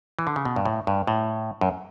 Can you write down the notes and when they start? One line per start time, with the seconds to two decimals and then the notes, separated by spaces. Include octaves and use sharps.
0.19 E3
0.27 D3
0.36 C#3
0.45 B2
0.56 G2
0.65 A2
0.87 G2
1.07 A2
1.61 F#2